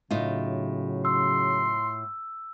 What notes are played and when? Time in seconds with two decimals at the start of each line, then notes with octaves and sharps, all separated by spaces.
0.11 A2 C#3 F#3 D#4 F4
1.05 C6 E6